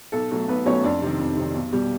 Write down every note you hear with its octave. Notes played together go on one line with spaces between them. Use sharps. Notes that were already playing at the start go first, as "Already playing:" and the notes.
B1 A4
B2 F#3 A3
B1 B3 B4
B2 F#3 A3 C#4 C#5
F2 D4 D5
C3 D#3
F2
C3 D#3
B1
B2 G3